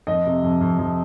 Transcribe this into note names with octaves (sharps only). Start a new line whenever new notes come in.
F2 D#5
C3
F2
F2
F2